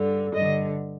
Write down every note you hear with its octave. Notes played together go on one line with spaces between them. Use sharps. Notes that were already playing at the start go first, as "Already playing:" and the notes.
Already playing: G2 D3
G2 D3 D#5